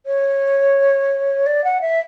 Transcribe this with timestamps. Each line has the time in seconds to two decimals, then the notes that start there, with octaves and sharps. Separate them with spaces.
0.06 C#5
1.46 D5
1.64 F#5
1.81 E5